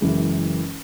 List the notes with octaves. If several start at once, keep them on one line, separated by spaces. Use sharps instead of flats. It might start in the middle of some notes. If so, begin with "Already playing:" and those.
F#1 F#2 E3 G#3